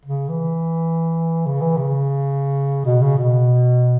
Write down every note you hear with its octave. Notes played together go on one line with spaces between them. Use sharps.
C#3
E3
C#3
E3
C#3
B2
C#3
B2